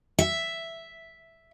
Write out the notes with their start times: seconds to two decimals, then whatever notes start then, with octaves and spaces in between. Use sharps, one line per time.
0.19 E5